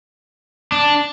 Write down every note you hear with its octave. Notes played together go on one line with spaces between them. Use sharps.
D4